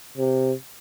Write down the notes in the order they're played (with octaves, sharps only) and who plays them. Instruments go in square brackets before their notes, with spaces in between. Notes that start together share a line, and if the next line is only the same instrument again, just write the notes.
[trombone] C3